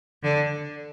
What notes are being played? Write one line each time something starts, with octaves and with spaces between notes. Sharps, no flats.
D3